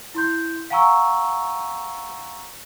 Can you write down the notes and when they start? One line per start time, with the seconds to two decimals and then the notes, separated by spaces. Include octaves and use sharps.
0.14 E4 C6 G6
0.70 F5 F#5 G#5 A#5 C#6 E6